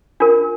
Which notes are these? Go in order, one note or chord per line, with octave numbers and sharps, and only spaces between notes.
D4 F4 A#4